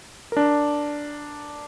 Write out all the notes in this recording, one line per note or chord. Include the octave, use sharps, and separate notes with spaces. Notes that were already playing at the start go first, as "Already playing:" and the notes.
D4 A#4